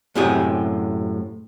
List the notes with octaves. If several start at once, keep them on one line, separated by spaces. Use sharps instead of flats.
F#2 A2 C3 G4 G#4